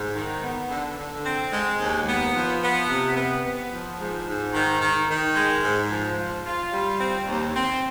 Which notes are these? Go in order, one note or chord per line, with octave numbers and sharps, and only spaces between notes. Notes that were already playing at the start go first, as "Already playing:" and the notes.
Already playing: G#2
D#3
B3
D3
D3
C4
G#3
D#2
B3
F3
B3
C3
B3
B3
F3
G#2
G#2
D#3
D#3
D#3
G#3
G#2
F3
F4
F4
G3
C4
D#2
C4